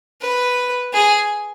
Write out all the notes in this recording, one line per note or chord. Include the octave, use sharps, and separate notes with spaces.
B4
G#4